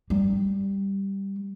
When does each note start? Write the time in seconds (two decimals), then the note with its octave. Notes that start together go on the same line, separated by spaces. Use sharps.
0.10 G3